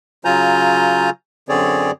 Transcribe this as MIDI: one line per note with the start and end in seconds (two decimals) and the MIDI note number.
0.25 1.10 49
0.25 1.10 54
0.25 1.10 65
0.25 1.10 80
0.25 1.10 82
0.25 1.10 91
1.49 1.91 42
1.49 1.91 50
1.49 1.91 60
1.49 1.91 68
1.49 1.91 73
1.49 1.91 74